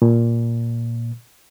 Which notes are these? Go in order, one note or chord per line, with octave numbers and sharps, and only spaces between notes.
A#2